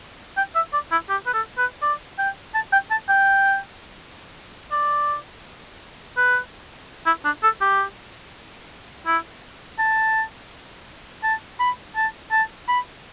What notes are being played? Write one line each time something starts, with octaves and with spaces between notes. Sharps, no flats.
G5
E5
D5
E4
G4
B4
A4
B4
D5
G5
A5
G5
A5
G5
D5
B4
E4
D4
A4
G4
E4
A5
A5
B5
A5
A5
B5